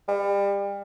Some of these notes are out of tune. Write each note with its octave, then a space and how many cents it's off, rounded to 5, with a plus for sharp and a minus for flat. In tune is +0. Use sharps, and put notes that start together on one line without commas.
G3 +30